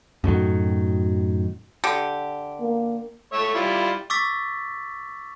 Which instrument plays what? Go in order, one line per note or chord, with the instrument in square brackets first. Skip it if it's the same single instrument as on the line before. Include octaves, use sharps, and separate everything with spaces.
[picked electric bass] F#2 A2 D#3 F#3
[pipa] D3 G4
[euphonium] A#3
[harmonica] A3 C#5 E5
G3 E4 F4
[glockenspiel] C#6 D6 E6 A6 B6